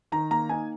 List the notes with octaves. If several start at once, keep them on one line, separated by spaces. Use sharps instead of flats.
D#3 A#5
A#3 A#5
D#4 G#5